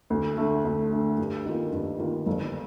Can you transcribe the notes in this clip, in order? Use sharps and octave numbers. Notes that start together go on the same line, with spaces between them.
D2
D3 A3
D2
D3 A3
G2
D#3 A#3 F4
G2
D#3 A#3 F4
G1